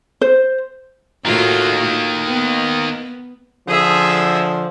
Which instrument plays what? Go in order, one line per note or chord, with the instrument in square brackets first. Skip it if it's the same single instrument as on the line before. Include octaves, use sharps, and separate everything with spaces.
[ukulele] C5
[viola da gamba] A2 F4 F#4 [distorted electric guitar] D#3 A#3
[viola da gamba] B3
[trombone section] D3 F3 [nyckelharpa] G#4 E5